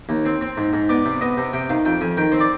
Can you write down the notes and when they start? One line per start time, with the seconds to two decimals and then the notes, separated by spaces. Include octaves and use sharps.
0.09 D#2
0.25 C4
0.41 C4
0.57 G#2
0.73 G#2
0.89 B3 D5
1.05 C3
1.21 B3 D#5
1.37 C3
1.53 C3 G5
1.69 D#3 F5
1.85 F2 G5
2.01 F2 G#5
2.17 D#3 G5
2.32 C4 C5
2.40 D5